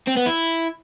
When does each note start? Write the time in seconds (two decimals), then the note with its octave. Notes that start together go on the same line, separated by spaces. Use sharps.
0.07 C4
0.17 B3
0.26 E4